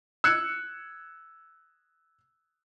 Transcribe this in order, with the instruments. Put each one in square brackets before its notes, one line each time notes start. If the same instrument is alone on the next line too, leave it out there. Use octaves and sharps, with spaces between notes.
[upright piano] E6 F#6 G#6 C#7